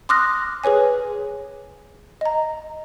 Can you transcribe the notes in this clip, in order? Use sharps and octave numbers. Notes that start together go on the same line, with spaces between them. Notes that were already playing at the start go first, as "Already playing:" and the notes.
C6 D6 D#6 F6 F#6 A#6
G#4 B4 C#5 G#5
D#5 A#5